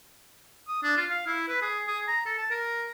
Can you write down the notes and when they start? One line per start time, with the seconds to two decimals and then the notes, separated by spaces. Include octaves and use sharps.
0.68 D#6
0.83 D4
0.97 F4
1.10 F5
1.27 E4
1.48 B4
1.62 G#4
1.88 G#4
2.08 A#5
2.26 A4
2.38 A5
2.51 A#4